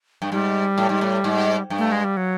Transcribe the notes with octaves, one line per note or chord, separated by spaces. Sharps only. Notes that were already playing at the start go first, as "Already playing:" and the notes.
G2
G#2 G3
A2
G#2
A2
G#2
G2
A3
G#3
G3
F#3